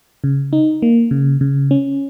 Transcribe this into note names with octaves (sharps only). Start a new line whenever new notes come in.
C#3
D#4
A#3
C#3
C#3
C#4